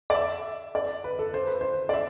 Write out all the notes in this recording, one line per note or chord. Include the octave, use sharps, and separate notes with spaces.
D5
E5
D5
B4
A4
C5
B4
C5
D5
E5